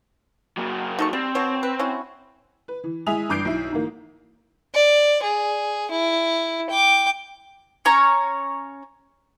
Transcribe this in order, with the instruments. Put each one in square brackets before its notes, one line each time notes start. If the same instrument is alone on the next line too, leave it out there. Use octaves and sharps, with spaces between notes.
[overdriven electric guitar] F#3 A#3
[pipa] D#4 A4 C#6
[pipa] G3 [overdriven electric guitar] C4
[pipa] B2 C#5
B4
C#4 E4 F#4
[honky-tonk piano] B4
E3
G#3 E4 G#5 D#6 B6 F7
A1 G2 D6 G6 C7 D7
B1 E4
G#2 E3 A#3
[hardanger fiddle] D5
G#4
E4
G5 D6
[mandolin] C#4 C#5 A#5 C#6